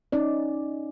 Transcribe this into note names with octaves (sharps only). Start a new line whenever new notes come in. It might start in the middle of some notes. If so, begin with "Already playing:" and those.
C#4 D#4 D5